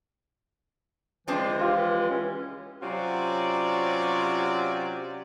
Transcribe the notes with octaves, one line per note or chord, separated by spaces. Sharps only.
C#2 E3 F3 G#3 C4 D4
F4 G4
C#2 C#4
C3 F#3 C#4 F4 F#4 D5